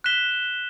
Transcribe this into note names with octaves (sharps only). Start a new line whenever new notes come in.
F#6 B6 E7 G7